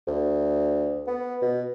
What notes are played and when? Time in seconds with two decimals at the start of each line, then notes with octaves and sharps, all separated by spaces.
0.07 D2
1.07 B3
1.42 B2